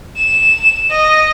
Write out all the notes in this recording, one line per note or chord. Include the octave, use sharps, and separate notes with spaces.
E7
D#5